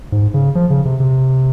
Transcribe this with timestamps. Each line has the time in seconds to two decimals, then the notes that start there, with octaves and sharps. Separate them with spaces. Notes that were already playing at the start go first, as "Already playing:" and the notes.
0.12 G#2
0.34 C#3
0.55 F3
0.70 C#3
0.85 C3
1.00 C3